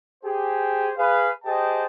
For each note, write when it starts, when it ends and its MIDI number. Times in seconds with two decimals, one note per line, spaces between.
0.24 0.91 67
0.24 0.91 68
0.24 0.91 72
0.98 1.30 68
0.98 1.30 71
0.98 1.30 77
1.45 1.85 67
1.45 1.85 68
1.45 1.85 72
1.45 1.85 75
1.45 1.85 79
1.45 1.85 81